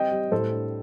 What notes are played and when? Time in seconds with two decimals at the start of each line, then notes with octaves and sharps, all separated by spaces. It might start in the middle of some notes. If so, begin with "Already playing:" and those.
Already playing: G3 C4 D#5 G5
0.12 G3
0.32 A2 A4 C5
0.51 D4